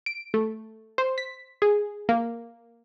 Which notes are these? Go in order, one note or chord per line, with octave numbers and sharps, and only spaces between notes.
D7
A3
C5
B6
G#4
A#3